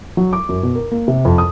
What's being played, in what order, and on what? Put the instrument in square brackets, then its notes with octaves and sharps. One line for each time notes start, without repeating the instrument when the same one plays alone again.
[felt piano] F#3
D6
F#2
B2
A#4
A#3
C3
F2
D#6